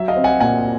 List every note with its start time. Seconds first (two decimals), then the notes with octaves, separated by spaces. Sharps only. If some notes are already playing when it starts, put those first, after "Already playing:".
Already playing: F#3 E5
0.08 D#5 F5
0.16 C4
0.24 F#5 G#5
0.40 A#2 F#5 G#5